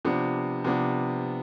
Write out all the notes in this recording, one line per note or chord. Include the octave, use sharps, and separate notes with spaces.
C3 F3 B3 D4
C3 F3 B3 D4